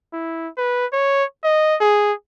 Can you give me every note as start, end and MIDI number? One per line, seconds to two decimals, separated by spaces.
0.13 0.48 64
0.58 0.86 71
0.93 1.24 73
1.44 1.76 75
1.81 2.13 68